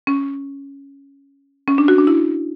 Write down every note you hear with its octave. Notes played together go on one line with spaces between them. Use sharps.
C#4
C#4
D4
F#4
D4
E4